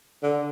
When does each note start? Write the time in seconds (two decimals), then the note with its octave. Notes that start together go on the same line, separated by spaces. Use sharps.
0.23 D3